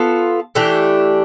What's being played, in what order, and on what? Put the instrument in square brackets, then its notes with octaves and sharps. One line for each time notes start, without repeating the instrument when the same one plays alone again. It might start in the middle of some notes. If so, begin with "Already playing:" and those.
Already playing: [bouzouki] B3 F4 A4
E3 A3 D4 G4